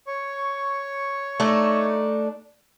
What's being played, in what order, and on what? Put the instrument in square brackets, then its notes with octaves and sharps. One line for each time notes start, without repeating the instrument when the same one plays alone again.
[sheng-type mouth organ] C#5 C#6
[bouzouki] A3 D4 D#4